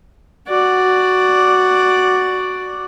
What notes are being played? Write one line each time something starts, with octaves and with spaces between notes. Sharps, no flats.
F#4 D5